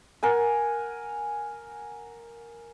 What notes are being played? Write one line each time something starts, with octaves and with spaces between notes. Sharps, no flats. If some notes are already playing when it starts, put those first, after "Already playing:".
A#4 F#5 G#5